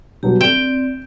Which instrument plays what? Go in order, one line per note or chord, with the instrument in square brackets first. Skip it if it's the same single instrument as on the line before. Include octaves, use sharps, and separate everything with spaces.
[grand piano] B2 F#3 G3 [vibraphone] G4
[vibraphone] C4 D5 [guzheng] G5 [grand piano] E7